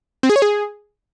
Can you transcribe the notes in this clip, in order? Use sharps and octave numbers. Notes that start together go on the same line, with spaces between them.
C4
G#4
C#5
G#4